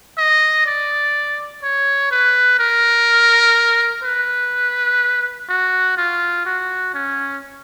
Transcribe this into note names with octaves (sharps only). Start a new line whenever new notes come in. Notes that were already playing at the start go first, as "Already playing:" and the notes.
D#5
D5
C#5
B4
A#4
B4
F#4
F4
F#4
C#4